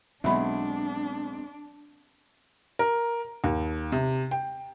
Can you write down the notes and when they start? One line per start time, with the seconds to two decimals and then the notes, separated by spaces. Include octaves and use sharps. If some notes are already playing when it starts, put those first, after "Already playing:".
0.24 B1 G#3 B3 C4 D4 E5 B5
2.79 A#4
3.44 D#2
3.92 C3
4.31 G5